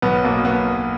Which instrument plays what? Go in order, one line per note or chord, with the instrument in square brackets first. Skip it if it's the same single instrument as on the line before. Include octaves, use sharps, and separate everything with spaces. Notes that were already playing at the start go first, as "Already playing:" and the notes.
[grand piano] B1 B3
B2 A#3
B3